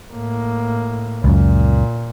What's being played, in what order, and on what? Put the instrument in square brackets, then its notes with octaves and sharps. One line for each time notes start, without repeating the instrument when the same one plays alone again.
[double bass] A2 A#3
[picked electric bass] C#2 F#2 [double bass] A#2